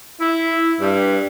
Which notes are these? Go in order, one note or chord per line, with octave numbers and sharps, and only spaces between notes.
E4
G2